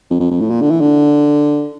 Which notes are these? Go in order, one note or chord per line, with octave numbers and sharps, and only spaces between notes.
F2
F2
F2
A2
A#2
D3
E3
D3